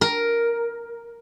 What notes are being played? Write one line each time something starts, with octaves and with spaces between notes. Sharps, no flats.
A#4